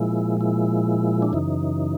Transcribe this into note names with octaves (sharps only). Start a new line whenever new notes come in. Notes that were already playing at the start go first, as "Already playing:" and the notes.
Already playing: A#2 F3 G#3 E4
E4
D4
F#2 C#3 E3 D#4